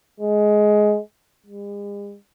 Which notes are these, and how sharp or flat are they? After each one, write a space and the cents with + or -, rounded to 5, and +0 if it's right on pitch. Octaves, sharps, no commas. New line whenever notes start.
G#3 +15
G#3 -45